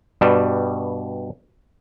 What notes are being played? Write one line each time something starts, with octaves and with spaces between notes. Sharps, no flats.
G2 B2 G3